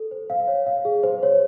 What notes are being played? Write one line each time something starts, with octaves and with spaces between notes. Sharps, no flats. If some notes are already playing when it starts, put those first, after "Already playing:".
Already playing: A4
C5
F5
C#5
F5
G#4
C5
C#5